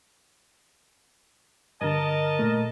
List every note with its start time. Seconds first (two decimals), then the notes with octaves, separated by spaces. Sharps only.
1.81 G2 D3 A#4 D#5 A5
2.39 A#2 A3